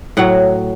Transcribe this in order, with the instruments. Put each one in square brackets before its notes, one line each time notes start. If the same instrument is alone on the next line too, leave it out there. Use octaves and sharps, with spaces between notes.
[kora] A2 F#3 F#5